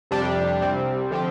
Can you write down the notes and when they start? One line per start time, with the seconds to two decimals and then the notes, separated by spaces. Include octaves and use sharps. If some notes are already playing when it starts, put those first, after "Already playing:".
0.11 F2 C3 G3 D4 G4
0.61 C2 C3 G3 C4
1.11 D3 F3 C4 G4